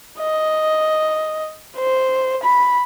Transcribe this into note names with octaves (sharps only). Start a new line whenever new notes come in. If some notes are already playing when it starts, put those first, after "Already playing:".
D#5
C5
B5